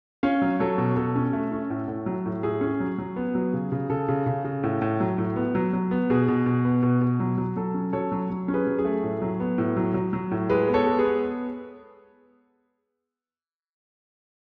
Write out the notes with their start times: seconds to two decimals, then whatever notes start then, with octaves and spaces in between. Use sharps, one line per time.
0.23 C#4 C#5 F5
0.42 F#3
0.59 F#3 A4 C#5
0.78 B2
0.96 B2 A4
1.16 C#4
1.33 A3
1.52 C#4
1.70 A2
1.88 A2
2.06 F#3
2.26 A2
2.43 A2 G#4
2.61 C#4
2.80 F#3
2.98 F#3
3.16 B3
3.35 F#3
3.53 C#3
3.72 C#3
3.90 C#3 A4
4.08 C#3
4.26 C#3
4.44 C#3
4.63 A2
4.82 A2
5.00 F#3
5.18 A2
5.36 B3
5.55 F#3
5.73 F#3
5.91 B3
6.10 B2 G#4
6.28 B2
6.46 B2
6.65 B3
6.83 B2
7.01 B2
7.20 F#3
7.38 F#3
7.57 F#3 A4
7.74 C#4
7.93 F#3 A4 C#5
8.12 F#3
8.30 F#3
8.48 C#4
8.54 G#4 B4
8.67 F#3
8.78 G#4
8.85 A3
9.03 A2
9.22 F#3
9.40 B3
9.58 A2
9.77 F#3
9.94 F#3
10.13 F#3
10.31 A2
10.50 G#3 G#4 B4
10.68 B3
10.74 A4 C#5
10.86 G#3
10.99 G#4 B4
11.05 B3